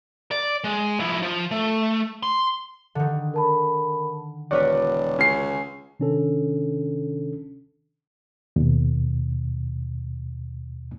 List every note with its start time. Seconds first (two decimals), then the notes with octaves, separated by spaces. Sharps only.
0.31 D5
0.64 G#3
1.00 F3 E4
1.22 F3
1.51 A3
2.23 C6
2.95 D3 D#3
3.34 A#4 A5 B5
4.51 E1 F#4 A#4 B4 C#5 D5
5.19 C#2 C#4 C7
6.00 C3 D#3 C#4 D4 A4
8.56 D#2 B2